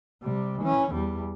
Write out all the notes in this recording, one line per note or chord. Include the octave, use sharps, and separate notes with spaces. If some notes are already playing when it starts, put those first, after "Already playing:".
C3 G3
E3 C#4
E2 G3